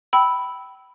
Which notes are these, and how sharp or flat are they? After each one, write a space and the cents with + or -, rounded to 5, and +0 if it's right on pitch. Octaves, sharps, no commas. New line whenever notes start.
G5 -20 B5 +0 E6 -10